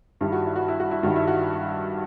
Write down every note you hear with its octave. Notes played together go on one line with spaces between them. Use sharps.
G2 D#3 G3 E4
F#4
E4
F#4
E4
F#4
E4
G2 D#3 G3 F#4
E4
F#4